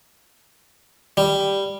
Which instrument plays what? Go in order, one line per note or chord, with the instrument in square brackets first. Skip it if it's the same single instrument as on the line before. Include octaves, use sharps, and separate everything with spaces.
[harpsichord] G3